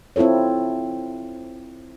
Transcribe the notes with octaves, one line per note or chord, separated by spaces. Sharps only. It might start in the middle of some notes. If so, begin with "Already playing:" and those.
C4 E4 F4 A4 C#5